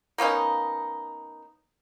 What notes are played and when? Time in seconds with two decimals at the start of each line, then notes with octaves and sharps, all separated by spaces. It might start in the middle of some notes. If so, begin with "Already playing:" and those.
0.18 A#3 B3 C#4 D#4